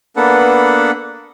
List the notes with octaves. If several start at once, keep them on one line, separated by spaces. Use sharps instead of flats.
A#3 B3 D4 A4 B4 F#5